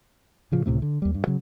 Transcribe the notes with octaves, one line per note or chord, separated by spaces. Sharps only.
A2 C#3 F3
C#2 A2 C3 A3
D3
D#2 G3
G2
C#3 F#3